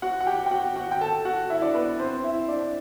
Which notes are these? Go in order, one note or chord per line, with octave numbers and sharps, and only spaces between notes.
F#4 F#5
F#5
G4 G5
G5
F#4 F#5
F#4 F#5
G5
A4 A5
F#4 F#5
E4 E5
D4 D5
B3 B4
C4 C5
E4 E5
D4 D5